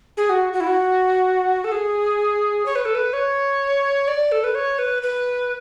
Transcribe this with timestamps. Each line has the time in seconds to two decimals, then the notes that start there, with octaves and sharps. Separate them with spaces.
0.17 G#4
0.30 F#4
0.53 F#4
0.60 E4
0.67 F#4
1.64 A4
1.72 G#4
2.66 C#5
2.76 B4
2.85 A4
2.95 B4
3.13 C#5
4.08 D5
4.32 A4
4.44 B4
4.55 C#5
4.79 B4
5.02 B4